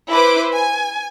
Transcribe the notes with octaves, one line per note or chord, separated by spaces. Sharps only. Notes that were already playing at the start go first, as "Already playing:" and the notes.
E4 B4 C5 D6
G#5